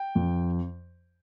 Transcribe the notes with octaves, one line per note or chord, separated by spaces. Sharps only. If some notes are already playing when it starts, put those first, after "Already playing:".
Already playing: G5
F2